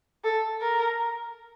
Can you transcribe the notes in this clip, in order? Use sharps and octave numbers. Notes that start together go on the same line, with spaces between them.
A4
A#4